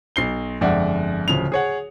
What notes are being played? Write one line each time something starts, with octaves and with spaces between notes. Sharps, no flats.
B1 C7 G7
G1 F2 G#3 D5 E5 F#5
D1 C#3 F3 F7
G#4 C#5 F#5